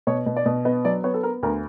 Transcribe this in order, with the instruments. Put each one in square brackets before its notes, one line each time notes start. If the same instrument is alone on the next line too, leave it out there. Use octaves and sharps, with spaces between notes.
[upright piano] B2 C#5
B2
D5
B2
B3 D#5
F#3 D5
B3 C#5
A4
B3 A#4
D2 A#4